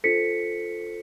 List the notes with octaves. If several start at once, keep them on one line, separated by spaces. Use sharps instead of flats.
D4 F4 A4 C5 B6 C#7